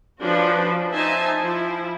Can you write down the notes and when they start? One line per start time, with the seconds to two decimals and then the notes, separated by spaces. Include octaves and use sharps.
0.21 F3 C#4 D4 F#4 B4
0.93 D#4 C5 E5 G#5 A5
1.41 F3 E4